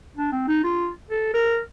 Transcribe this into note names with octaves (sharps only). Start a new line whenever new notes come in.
D4
C4
D#4
F4
A4
A#4